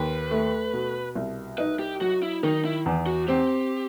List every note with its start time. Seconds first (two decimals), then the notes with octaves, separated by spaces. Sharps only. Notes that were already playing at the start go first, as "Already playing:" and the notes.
Already playing: D#2 B4
0.31 A3
0.73 B2
1.15 C2
1.58 D#4 B4
1.79 G4
2.01 F#3 F#4
2.23 E4
2.43 D#3 D#4
2.65 E4
2.86 E2
3.06 F#4
3.28 C4 G4